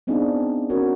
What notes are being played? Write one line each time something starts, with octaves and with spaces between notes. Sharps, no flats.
B3 C4 D4 D#4 F4 G#4
C#4 F#4 A#4 C#5